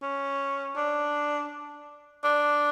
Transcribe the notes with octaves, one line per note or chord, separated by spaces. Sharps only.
C#4
D4
D4